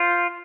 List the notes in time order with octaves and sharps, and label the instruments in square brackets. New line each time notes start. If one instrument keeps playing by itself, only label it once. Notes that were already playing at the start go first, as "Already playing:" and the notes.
Already playing: [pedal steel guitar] F4 C5